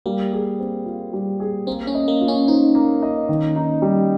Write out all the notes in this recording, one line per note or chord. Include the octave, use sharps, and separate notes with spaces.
G3 A#3
G#4
C4
F4
G3
G#4
A#3 C4
C#4
D#5
A#3
F4
C#4
D#4 C5
A#3
D#5
D#3
D#4
G3